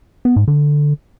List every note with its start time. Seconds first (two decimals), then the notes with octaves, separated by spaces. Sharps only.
0.25 B3
0.36 G#2
0.48 D3